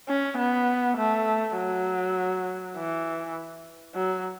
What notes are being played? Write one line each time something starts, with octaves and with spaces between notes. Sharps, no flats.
C#4
B3
A3
F#3
E3
F#3